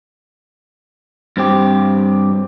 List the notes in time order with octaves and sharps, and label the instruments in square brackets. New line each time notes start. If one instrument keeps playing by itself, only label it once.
[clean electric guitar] G2 C4 G4